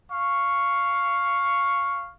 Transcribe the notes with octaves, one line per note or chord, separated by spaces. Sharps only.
F5 C#6